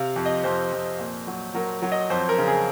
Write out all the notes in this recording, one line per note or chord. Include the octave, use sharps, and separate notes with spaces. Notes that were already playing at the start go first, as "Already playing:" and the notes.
Already playing: C3 F5
F2
D#5
F2 C5
F2
A#2
F#3
F#3 A#4
F#3
D#5
F2 C5
A#4
C#3
G#4